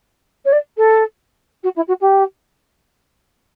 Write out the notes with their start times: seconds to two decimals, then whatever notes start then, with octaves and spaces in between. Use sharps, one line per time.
0.45 C#5
0.52 D5
0.77 A4
1.63 F#4
1.76 E4
1.87 F#4
2.01 G4